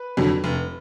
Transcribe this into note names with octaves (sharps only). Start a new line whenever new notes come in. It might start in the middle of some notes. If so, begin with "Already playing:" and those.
Already playing: B4
F2 D3 F#3
F1